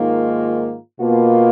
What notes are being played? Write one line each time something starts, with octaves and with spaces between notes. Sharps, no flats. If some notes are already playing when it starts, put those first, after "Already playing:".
Already playing: G#2 D#3 A#3 F4
B2 A#3 F4